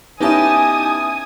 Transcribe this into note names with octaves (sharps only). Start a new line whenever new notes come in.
B3 C#4 D#4 E4 G4 G#5 A5 D#6